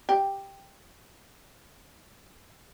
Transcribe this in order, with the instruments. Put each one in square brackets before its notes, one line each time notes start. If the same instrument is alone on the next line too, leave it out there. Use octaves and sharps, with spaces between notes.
[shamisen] G4